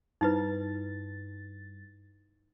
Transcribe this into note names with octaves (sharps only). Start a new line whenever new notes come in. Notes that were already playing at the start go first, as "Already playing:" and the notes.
G2 D#4 E4 B4 A6